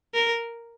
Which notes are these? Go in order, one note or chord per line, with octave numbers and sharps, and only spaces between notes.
A#4